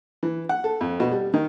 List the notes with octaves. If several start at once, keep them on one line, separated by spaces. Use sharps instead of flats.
E3
F#5
A4
F2
B2
G3
D#3